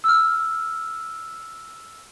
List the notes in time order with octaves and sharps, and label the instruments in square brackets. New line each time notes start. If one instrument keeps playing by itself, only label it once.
[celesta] E6 F6